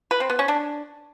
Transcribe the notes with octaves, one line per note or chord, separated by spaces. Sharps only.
B4
C4
B3
C#4
D4